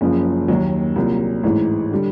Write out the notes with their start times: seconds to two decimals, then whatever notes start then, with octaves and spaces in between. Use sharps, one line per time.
0.01 F#1 F#2 C#3 F3
0.48 D#2 D#3 F#3
0.96 C2 A#2 F#3
1.43 A1 G#2 E3
1.92 D3 G3